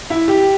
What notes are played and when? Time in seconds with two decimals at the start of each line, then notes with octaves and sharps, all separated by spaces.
0.10 E4
0.28 G4